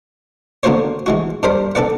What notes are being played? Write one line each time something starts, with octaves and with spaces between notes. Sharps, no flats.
D3 A#3 B3 F#4 C5 C#5
E3 G#3 F#4
G2 D4 A#4 C5 B5
D4 A4 B4 D5 F#5